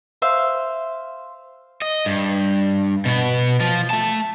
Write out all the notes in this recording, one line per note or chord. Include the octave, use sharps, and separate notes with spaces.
C5 E5 F5
D#5
G2
B2 B3
F3 F4
A3 A5